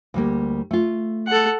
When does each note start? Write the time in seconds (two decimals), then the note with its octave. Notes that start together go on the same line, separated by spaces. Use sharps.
0.14 D2 G3 A#3
0.71 A3 F4
1.27 A4 F#5